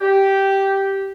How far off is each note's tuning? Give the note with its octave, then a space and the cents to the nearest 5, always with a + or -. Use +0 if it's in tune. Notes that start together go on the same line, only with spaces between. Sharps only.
G4 -10